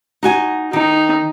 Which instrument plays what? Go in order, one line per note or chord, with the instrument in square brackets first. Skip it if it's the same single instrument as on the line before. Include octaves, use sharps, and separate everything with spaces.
[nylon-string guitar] D#4 F#4 G#5
[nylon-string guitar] D#3 [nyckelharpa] D#4